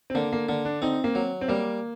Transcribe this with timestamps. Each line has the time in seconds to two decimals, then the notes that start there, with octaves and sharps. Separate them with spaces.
0.10 C4
0.15 D3 A#3
0.33 A#3
0.48 D3 A#3
0.65 D4
0.82 C4 D#4
1.04 A#3
1.15 F#3
1.41 C4
1.48 G3 A#3